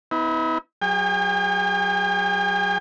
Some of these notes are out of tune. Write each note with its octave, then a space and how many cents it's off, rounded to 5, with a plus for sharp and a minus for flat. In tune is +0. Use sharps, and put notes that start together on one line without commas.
B3 +15 E4 -45
F#3 +0 G#4 -30 G5 +40